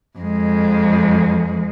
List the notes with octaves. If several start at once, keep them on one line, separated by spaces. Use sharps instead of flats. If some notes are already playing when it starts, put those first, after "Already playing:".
F2 G#3